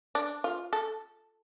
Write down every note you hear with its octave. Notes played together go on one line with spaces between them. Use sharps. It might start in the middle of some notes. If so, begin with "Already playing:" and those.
D4
F4
A4